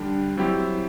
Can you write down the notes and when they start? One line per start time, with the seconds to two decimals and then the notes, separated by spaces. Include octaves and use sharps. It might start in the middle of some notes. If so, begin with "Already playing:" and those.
Already playing: D3 G3 D4 G4
0.37 F#3 C4 E4 G4